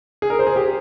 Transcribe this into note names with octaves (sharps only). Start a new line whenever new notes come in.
G#4
A#4
C5
G#4
G4